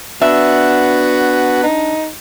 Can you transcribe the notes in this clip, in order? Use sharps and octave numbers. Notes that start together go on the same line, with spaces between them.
B3 D4 F#4 B4 E5
D#4